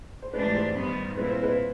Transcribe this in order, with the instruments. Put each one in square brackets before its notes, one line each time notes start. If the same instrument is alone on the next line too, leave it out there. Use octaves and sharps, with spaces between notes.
[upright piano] C5
[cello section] G#2 E3 A3 D4 G4 [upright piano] B4
[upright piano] C5
[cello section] G2 D#3 G3 B3
[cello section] A#2 G3 C4 E4 [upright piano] B4
[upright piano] C5
B4